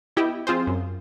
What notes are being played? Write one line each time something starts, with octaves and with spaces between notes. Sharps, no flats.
B3 E4 G4 D#5 G5
F3 C4 F4 G#4 C5
F#2